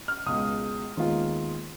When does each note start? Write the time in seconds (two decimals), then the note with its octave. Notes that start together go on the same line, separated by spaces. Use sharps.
0.08 F6
0.26 C#2 B2 G#3 D#6
0.97 D#2 D#3 G#3 B3 F4